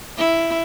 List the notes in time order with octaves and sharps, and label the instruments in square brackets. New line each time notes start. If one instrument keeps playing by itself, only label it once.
[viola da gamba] E4